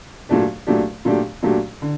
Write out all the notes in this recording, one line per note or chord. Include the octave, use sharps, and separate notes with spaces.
A#2 F#3 A3 D4 G4
A#2 F#3 A3 D4 G4
A#2 F#3 A3 D4 G4
A#2 F#3 A3 D4 G4
D3